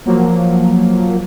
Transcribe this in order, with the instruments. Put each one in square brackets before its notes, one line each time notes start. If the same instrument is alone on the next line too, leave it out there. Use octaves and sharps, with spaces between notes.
[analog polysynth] F3 F#3 A#3